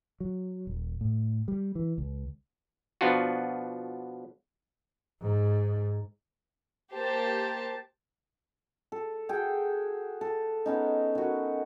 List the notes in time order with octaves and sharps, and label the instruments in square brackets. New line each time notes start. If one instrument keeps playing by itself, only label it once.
[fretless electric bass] F#3
D#1
A2
G3
E3
C#2
[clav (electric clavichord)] B2 F3 B3 D4 F4 F#4
[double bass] G#2
[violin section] A#3 G4 C5 A5
[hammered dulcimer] A4
F#4 G#4 A4 G5
A4
B3 C#4 D#4
D#3 F#4